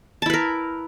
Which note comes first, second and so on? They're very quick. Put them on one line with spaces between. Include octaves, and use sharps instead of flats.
A5 E4 B4 A#4